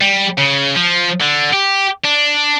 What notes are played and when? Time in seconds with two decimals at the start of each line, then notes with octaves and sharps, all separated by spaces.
0.01 G3
0.38 C#3
0.76 F3
1.22 D3
1.54 G4
2.04 D4